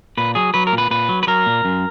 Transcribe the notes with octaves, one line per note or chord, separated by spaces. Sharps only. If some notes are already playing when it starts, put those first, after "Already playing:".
A#2 B4
F#3 G#4
F#3 B4
A#4
A#2
B4
A#2 B4
F#3
B4
F#3 A#4
A#2
F#2